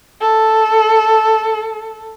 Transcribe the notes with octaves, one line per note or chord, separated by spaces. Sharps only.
A4